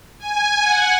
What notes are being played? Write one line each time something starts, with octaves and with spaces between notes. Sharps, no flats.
G#5
F#5